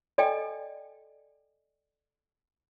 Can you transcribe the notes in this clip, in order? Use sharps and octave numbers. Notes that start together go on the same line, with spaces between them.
A4 D5 D#5 G5 G#5